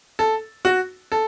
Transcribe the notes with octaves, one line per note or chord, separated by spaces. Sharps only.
A4
F#4
A4